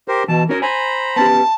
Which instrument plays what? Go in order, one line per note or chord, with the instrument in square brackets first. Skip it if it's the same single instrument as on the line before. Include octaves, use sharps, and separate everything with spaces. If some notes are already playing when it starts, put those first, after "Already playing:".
[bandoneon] G4 A#4 C5
[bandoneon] B2 A5 [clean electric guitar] E3
[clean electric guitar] C#4 F#4 C#5 [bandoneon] A#4
[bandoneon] C5 A#5 B5 [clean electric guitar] G#5
[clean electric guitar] B3 C#4 G4 [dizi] A5